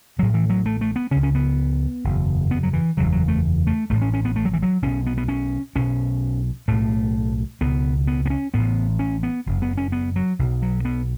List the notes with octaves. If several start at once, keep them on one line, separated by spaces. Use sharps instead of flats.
A1 A2 F#3
E3
F#3
A3
A3
B3
C#2 C#3 C#4
C#4
B3
F#1 E2 B2
B3
F#3
E3
F#1 E2 C#3 F#3
F#3
A3
A3
A1 A2 A3
C#4
C#4
B3
A3
F#3
E3
F#3
B1 B2 C#4
B3
B3
C#4
B1 B2 C#4
B1 A2 A3
C#2 B2 B3
B3
B3
C#4
A1 A2 B3
C#4
B3
F#1 F#2 C#3
B3
C#4
B3
F#3
B1 B2
F#3
B3